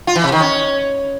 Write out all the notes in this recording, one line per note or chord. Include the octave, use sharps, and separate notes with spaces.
F4
E3
C3
D#3
C#4